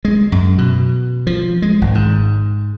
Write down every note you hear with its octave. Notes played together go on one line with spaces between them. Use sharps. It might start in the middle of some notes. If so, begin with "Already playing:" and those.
G#3
F#2
B2
F3
G#3
G#1
G#2